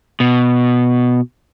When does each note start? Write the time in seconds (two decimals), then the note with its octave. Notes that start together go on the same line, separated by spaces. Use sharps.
0.20 B2